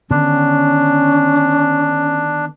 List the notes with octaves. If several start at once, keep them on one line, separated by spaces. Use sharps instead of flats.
D3 D#3 B3 C#4 D4